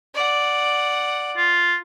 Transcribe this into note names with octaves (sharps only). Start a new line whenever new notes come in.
D5 F#5
F4